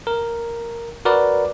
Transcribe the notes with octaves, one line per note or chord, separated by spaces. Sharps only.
A#4
F#4 A#4 B4 D5